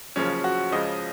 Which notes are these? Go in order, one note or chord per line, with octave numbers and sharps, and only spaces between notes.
F#1 F#2 C#3 F3 C#4
F#4
C#2 C#3 F3 D#5